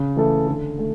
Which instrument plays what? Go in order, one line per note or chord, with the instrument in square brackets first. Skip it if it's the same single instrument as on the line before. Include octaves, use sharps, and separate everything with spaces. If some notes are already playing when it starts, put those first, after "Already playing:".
Already playing: [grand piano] C#3
E3 A3 E4 A4
D3
A3